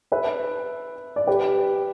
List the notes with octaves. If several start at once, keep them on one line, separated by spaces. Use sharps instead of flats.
B4 E5
D5
G4 B4